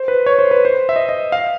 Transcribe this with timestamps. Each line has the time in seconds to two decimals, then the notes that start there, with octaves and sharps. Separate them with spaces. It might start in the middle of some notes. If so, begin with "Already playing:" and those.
Already playing: C5
0.08 B4
0.26 C#5
0.39 C5
0.51 B4
0.65 C5
0.89 E5
0.96 D#5
1.09 D#5
1.32 F5